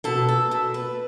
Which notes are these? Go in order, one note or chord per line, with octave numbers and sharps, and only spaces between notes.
B2 A4
A4
B2 A4
B4